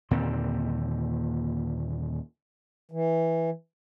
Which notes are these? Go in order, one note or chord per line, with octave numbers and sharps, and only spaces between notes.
D#2 A#2 D3 C4
E3